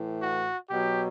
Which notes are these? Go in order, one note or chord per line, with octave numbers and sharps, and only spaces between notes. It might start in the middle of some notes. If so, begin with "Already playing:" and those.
Already playing: A2 E3
F#4
B2 F#3 G4